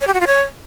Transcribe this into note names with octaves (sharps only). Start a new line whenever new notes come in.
C#5
G4
F#4
F4
C#5